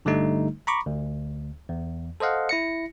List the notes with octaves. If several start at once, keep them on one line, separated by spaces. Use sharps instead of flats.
G1 D3 G3 A3 D#4
A#5 B5 C#6 D6
D2
E2
A4 C5 D#5 F5 F#5
E4 A#6 C#7